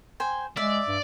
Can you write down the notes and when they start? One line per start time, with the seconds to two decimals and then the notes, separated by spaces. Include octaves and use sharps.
0.20 C5 G5 G#5
0.57 G#3 D5 E5
0.87 G2